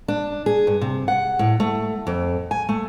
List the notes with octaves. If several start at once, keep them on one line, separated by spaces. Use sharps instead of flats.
D4
G#4
G2
C3
F#5
A2
A3
F2
G#5
A3